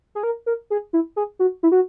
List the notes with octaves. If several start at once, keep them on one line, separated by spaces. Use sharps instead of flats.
G#4
A#4
A#4
G#4
E4
G#4
F#4
E4
F#4